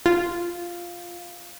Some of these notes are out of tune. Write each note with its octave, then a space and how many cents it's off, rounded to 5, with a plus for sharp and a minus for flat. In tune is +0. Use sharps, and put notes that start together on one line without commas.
F4 +0